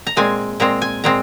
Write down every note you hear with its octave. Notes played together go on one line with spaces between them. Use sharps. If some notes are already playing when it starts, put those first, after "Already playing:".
A#5
A#2 G#3 C4 G#5
A#2 G#3 C4 A#5
G#5
A#2 G#3 C4 A#5